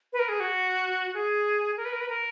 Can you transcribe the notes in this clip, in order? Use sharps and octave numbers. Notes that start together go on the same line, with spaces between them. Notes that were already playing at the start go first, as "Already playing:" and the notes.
B4
A#4
G#4
F#4
G#4
A#4
B4
A#4
B4
A#4